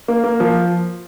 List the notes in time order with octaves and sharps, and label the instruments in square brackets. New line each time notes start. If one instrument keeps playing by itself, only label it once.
[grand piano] A#3
A#3
F3